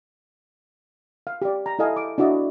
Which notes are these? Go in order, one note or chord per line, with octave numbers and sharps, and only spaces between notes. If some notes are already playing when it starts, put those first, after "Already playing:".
F5
G4 D5
A#5
E4 A4 D#5 F5 G#5
D6
D4 E4 F#4 D5 D#5